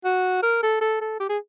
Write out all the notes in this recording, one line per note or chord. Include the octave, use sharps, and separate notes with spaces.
F#4
A#4
A4
A4
A4
G4
G#4